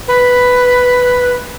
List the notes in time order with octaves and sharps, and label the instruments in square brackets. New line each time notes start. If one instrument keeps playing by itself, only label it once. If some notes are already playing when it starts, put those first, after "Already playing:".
[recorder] B4